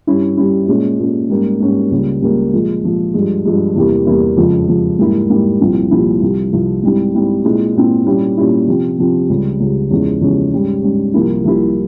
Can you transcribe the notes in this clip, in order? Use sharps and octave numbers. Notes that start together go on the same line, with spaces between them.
G2 G3 C#4 E4
G2 G3 C#4 E4
A#2 G#3 C#4
A#2 G#3 C#4
G#2 G3 A#3 C#4
G#2 G3 A#3 C#4
C#2 C#3 G3 A#3
C#2 C#3 G3 A#3
A#2 F3 G#3
A#2 F3 G#3
G2 F3 G#3
G2 F3 G#3
E2 C3 G3 A#3 E4
E2 C3 G3 A#3 E4
F2 C#3 F3 G#3
F2 C#3 F3 G#3
G#2 G3 A#3 E4
G#2 G3 A#3 E4
C2 A#2 F3 C4 E4
C2 A#2 F3 C4 E4
C2 C3 F3
C2 C3 F3
G#2 G3 C4 E4
G#2 G3 C4 E4
A#2 G#3 C4 E4
A#2 G#3 C4 E4
A#2 G3 C#4 E4
A#2 G3 C#4 E4
C3 F3 C4
C3 F3 C4
C#2 C#3 G3
C#2 C#3 G3
E2 C#3 F3 G#3 C#4
E2 C#3 F3 G#3 C#4
G#2 G3 C#4
G#2 G3 C#4
C2 C3 F3 A#3 E4
C2 C3 F3 A#3 E4